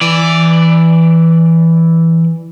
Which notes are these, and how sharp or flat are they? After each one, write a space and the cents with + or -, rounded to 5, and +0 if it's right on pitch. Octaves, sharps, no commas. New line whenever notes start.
E3 +0 D5 +0